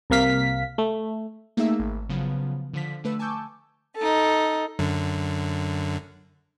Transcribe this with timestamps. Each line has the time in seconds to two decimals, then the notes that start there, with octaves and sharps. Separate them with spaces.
0.10 C2 C3 A#3 F5 B6
0.78 A3
1.57 A3 A#3 D#4 G#4 E5 E6
1.79 G#1
2.09 C#3 F3 F#3 B3
2.74 D3 F3 B6
3.04 D3 A3 B4 E6
3.19 G#5 A5 C#6 D6 E6 G6
3.96 D#4 A4
4.79 F#2 D3